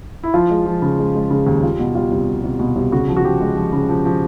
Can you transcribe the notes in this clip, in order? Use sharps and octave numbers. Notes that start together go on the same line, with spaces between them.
E4
F3 F4
G#3
F3
C#3
G#3
G#3
C#3
D#2
G3 F4
B2
G3 F4
C2
B2
C2
B2
C2
C#3 F#4
F3
F#4
F3 G4
G#3
F3
C#3
F3
F3